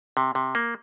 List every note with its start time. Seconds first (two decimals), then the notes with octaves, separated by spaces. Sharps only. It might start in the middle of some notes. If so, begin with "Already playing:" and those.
0.17 C3
0.35 C3
0.55 A#3